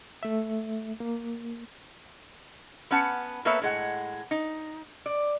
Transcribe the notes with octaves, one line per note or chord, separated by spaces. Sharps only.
A3 E5
A#3
B3 C#4 F#5 A5
A#3 B3 A4 B4 C#5 E5
A2 G#3 F#5
D#4
D5